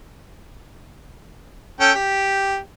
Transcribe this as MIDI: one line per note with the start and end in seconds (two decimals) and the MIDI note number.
1.80 1.92 61
1.80 1.92 69
1.80 1.92 79
1.95 2.58 67